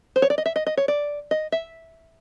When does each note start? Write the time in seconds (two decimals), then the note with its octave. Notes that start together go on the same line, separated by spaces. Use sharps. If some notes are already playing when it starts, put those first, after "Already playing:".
0.16 C5
0.22 C#5
0.30 D5
0.38 D#5
0.46 E5
0.56 D#5
0.67 D#5
0.77 C#5
0.88 D5
1.31 D#5
1.52 E5